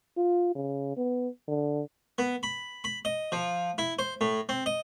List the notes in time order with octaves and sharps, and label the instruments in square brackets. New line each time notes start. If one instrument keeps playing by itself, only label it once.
[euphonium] F4
C#3
B3
D3
[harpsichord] B3
B5
B5
D#5
F3
E4
C5
A2
C4
D#5